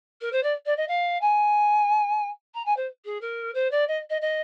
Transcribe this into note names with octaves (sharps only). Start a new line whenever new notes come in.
A#4
C5
D5
D5
D#5
F5
G#5
A#5
G#5
C5
G#4
A#4
C5
D5
D#5
D#5
D#5